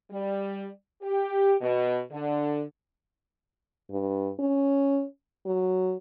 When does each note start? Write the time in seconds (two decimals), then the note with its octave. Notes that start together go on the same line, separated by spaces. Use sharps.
0.11 G3
1.01 G4
1.61 B2
2.10 D3
3.91 G2
4.39 C#4
5.46 F#3